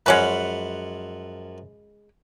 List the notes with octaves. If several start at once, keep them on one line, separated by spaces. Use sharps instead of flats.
F#2 F3 G#3 C#4 B4 F#5